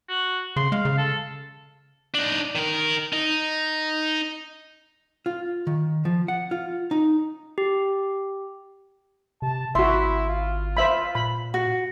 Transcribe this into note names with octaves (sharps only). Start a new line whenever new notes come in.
F#4
C#3 C6
G#3 F5
C#3
A4
D4 D#4
D#3 A#4
D#4
F4
D#3
F3
F#5
F4
D#4
G4
C3 A5
G#1 E4 F#4 E5 C6
F4
C5 E5 B5
A#2 B5
F#4